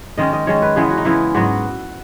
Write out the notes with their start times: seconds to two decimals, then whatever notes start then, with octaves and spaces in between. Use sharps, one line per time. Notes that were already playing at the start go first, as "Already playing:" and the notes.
0.17 D#3 G#3 C#4 D#5
0.33 D#5
0.47 D#3 G#3 C#4 C#5
0.62 B4
0.76 C#3 E3 G#3 B3 G#4
0.91 F#4
0.98 D#4
1.05 C#3 E3 G#3 B3 E4
1.35 G#2 F#3 B3 F#4